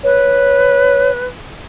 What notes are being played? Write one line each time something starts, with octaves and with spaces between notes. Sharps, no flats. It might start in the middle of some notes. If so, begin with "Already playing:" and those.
B4 C#5